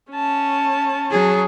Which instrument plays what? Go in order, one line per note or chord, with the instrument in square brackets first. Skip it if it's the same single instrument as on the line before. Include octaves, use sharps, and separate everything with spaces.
[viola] C#4 A5
[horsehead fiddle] F#3 G#4